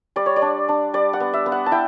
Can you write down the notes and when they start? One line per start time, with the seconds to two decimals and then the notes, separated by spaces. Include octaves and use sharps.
0.16 G3 D5
0.26 C#5
0.36 D5
0.42 D4
0.69 D4
0.94 G3 D5
1.13 F#5
1.20 B3
1.33 E5
1.46 B3
1.52 F#5
1.66 A5
1.71 E4 G5